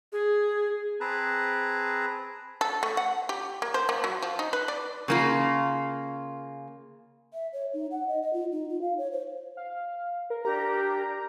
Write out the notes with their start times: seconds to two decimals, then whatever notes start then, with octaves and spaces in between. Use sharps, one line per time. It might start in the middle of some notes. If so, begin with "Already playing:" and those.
0.12 G#4
1.00 C4 G#4 B4 A5 A#5
2.61 A4
2.83 A3
2.97 F#5
3.29 G4
3.62 A#3
3.74 C5
3.89 A#3
4.04 F#3
4.22 F3
4.39 D#4
4.53 B4
4.68 D5
5.08 C#3 A#3 F4
7.34 E5
7.53 C#5
7.74 D#4
7.91 F#5
8.08 D#5
8.22 D#5
8.33 F4
8.52 D#4
8.69 F4
8.82 F5
8.98 C#5
9.12 C5
9.57 F5
10.30 A#4
10.45 D4 G4 A#4 A#5